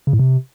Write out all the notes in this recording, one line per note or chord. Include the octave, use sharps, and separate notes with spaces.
C#3
A2
C3